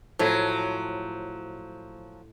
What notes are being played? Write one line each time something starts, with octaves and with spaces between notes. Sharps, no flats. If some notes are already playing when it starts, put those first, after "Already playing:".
A2 F3 F#3